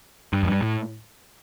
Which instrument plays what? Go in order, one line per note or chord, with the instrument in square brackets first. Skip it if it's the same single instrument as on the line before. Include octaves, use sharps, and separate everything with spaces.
[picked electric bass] G2
F2
G2
A2